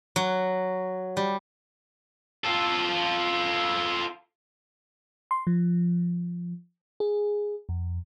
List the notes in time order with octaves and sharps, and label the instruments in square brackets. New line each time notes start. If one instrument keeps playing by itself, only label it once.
[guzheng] F#3
G3
[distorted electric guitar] F4 A4
[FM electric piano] C6
F3
G#4
F2